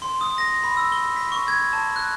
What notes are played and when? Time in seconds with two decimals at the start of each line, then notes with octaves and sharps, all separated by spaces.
0.02 C6
0.21 D#6
0.38 A#6
0.64 B5
0.77 E6
0.92 G7
1.16 B6
1.32 C#6
1.48 G#6
1.73 A5
1.96 F#6